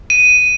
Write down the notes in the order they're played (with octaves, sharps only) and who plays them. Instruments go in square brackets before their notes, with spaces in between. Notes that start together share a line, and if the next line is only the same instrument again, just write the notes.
[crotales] D#7